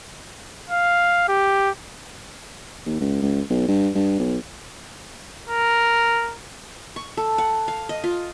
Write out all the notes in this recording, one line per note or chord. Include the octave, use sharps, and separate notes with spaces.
F5
G4
D#2
C#2
C#2
B1
G2
G2
B1
A#4
C#6
A4
F#5
F5
D#5
F4